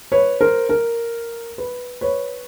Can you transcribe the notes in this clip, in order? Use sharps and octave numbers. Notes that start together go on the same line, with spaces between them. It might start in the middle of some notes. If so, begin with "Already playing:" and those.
B4 C#5
A#4 C5
A#4
B4
B4 C#5